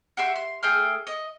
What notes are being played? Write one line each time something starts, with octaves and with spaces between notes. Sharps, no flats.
F#4 G4 E5 C6
C6
A3 G#4 G5 F6
D#5